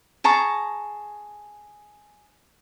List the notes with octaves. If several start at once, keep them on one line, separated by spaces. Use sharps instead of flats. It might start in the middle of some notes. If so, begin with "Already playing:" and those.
G#4 A5 A#5 C#6